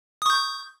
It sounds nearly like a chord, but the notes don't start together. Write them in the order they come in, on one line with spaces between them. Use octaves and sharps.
D#6 C#6 G6